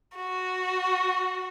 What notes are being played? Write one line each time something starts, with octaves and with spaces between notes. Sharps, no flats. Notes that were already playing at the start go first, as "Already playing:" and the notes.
F#4